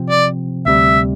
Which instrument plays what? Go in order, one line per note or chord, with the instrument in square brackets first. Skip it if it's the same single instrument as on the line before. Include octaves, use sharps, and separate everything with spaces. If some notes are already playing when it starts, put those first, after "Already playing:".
Already playing: [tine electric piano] C3 F3 C4
[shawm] D5
[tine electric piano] D2 C3 G3 [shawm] E5